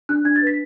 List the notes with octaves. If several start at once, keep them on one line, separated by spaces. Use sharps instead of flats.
D4 F#6
D4 G#6
A6
B4
B6